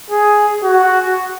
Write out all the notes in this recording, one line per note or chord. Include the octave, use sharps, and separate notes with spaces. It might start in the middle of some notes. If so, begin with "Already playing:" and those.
G#4
F#4